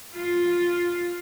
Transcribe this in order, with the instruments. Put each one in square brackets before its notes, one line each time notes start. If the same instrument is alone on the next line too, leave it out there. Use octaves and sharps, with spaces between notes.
[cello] F4